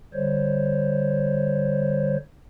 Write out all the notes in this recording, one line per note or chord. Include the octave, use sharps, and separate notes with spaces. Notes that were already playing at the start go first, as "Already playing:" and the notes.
D3 G3 C5 C#5